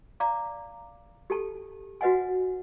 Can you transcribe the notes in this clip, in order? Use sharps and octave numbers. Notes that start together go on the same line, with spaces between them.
D5 F5 A#5 D6
G4 A4 A5
F#4 B4 D#5 F#5 G#5